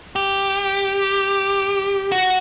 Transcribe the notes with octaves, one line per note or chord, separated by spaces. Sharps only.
G4
F#4